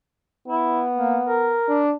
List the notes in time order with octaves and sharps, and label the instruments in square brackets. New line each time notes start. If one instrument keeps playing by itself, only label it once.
[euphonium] B3 [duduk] E4
[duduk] A#3
A#4
[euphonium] D4